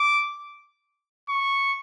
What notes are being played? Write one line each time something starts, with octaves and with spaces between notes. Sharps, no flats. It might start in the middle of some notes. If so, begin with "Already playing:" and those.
Already playing: D6
C#6